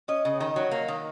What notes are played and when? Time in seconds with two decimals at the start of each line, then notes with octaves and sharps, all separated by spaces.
0.08 C#4 D#5
0.25 C#3
0.40 D#3 D#5
0.56 F#3
0.71 A#3
0.88 D#3